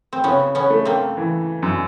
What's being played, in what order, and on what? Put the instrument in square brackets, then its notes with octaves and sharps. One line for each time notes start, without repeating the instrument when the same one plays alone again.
[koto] C4
[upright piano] C#3 [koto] B3 C#4
[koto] B3 C#4
[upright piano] A3
[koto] A#3 C4
[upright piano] E3
F#2